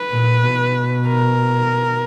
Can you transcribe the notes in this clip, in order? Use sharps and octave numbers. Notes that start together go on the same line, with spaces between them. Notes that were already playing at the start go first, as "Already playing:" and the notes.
Already playing: B4
A#2
B2
A#4